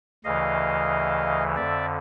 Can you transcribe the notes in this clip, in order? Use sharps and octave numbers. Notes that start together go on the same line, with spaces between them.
D2 C#3 E3 D#5 F5
F2 D3 D5 E5